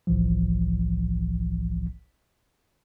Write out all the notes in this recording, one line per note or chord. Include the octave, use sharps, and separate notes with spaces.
G1 C2 A2 E3 F3